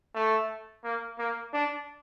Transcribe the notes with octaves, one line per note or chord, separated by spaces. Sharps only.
A3
A#3
A#3
D4